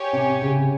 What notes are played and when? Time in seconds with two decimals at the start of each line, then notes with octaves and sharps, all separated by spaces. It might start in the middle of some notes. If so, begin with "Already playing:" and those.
Already playing: G4 C#5 G#5
0.13 C3
0.42 C#3